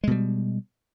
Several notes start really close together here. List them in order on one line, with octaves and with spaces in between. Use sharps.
G#3 B2 G3